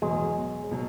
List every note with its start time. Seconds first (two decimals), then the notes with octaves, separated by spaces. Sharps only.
0.02 E2 B2 F#3 G#3
0.71 B2 F#3